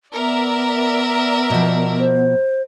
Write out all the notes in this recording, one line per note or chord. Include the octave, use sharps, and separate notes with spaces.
B3 A#4 D5 E5
B2 F3
C5